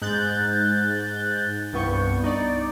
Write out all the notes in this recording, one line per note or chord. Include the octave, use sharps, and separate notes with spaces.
G#2 F#6 G6 A6
C2 G2 B3 C#6 G6
D#4 D5